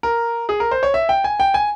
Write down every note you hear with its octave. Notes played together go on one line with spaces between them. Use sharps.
A#4
G#4
A#4
C5
C#5
E5
G5
G#5
G5
G#5